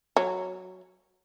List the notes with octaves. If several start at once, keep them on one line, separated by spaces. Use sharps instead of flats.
F#3